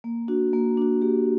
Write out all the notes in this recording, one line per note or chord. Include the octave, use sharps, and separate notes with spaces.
A#3
D4 F#4
A#3
D4 F#4
A#3 G4